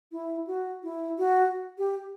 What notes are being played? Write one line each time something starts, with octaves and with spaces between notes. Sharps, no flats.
E4
F#4
E4
F#4
G4